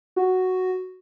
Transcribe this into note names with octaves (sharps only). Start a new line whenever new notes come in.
F#4